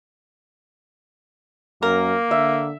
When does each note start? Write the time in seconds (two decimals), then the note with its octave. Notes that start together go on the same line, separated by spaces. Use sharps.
1.83 F#2 A#3 A#4
2.31 D3 E5